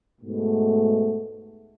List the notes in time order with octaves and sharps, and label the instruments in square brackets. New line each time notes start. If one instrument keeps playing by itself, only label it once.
[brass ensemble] G#2 B2 A3